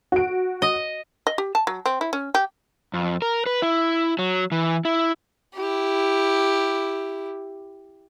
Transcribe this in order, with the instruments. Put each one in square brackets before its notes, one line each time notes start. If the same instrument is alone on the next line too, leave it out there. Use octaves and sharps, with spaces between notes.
[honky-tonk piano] F#4 D7
[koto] D#5
[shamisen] D#5
G4
A5
F#3
C4
E4
C#4
G4
[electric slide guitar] F2
A#4
B4
E4
F#3
E3
E4
[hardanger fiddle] E4 G4